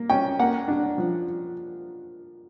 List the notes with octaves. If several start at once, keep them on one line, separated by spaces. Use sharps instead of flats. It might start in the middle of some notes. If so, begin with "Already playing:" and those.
Already playing: A#3
C#4 G5
A#3 F#5
D4
F3